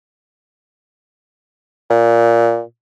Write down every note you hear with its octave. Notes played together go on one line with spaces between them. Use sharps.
A#2